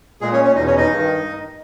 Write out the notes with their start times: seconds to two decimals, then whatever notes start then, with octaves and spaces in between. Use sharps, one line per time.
0.21 A#2 G#3 G#4
0.33 C#4 C#5
0.43 C#4 C#5
0.54 E2 B2 D#4 D#5
0.66 C#4 C#5
0.77 D#4 D#5
0.89 G2 D#3